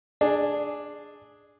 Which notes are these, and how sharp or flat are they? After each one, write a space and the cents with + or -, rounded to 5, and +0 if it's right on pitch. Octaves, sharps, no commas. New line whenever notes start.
D4 +0 G#4 +0